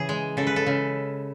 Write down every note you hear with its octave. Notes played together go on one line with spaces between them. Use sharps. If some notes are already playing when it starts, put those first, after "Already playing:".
Already playing: C#3 E3 G#4
G#3
C#3 A4
B4
A4
C#3